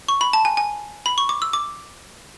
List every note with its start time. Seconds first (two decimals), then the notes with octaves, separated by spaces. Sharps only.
0.08 C#6
0.21 B5
0.33 A5
0.45 G#5
0.57 G#5
1.06 B5
1.18 C#6
1.29 D6
1.42 E6
1.53 D6